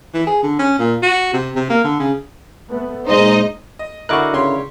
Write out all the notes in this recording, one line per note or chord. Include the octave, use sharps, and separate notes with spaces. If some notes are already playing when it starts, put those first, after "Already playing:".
E3
G#4
D3
C#4
A#2
F#4
C3
C3
A#3
D3
C#3
A3 B3
A#2 G#3 A#3 D#4 C5 D#5
D#5
D3 E4 F#4 A#4 D#5 C#6 D6 F#6
C#3 G4 C#5 C6